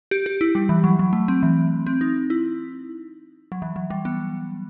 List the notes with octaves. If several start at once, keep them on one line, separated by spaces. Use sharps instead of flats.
G4
G4
E4
G3
E3
F#3
F#3
A3
C4
E3
C4
D#4
E4
F#3
E3
F#3
G3
B3